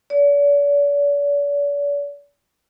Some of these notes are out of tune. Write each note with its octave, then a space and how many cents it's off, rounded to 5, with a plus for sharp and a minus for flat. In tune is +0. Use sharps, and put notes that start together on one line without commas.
D5 -45